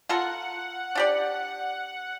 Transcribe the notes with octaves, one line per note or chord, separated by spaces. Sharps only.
F4 A4 A#4 F#5
D4 G4 D5